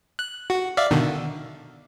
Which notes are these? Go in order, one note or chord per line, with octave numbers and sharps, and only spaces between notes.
F#6
F#4
D5 E5 F5
B2 D3 D#3